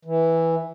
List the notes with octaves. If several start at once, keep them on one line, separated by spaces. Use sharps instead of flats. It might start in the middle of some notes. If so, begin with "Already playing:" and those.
E3